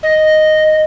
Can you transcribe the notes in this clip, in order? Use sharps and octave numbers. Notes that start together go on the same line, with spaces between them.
D#5